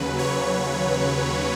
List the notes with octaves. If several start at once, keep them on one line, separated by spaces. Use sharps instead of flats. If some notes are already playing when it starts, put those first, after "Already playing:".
Already playing: D#2 C#3 F#3 B4
C#5